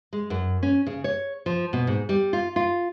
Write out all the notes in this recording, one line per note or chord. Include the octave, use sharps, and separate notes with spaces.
G#3
F#2
C#4
C#3
C#5
F3
B2
G#2
G3
F4
F4